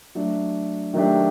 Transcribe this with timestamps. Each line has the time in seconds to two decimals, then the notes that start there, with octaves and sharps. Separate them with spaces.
0.15 F#3 A3 D4
0.94 D#3 F#3 A3 D4 G4